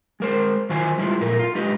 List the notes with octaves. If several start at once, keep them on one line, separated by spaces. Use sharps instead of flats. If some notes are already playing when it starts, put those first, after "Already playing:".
G#3 A#4 C5
D#3 F#3 F4 C5 G#5
G3 G#3 E4 F4
F2 A#2 A3 A#4
F4
G#3 D#4 G4 B4